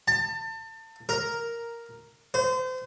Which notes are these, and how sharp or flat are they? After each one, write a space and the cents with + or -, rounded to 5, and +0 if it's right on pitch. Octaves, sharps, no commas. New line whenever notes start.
A5 +30
A#4 +0
C5 -35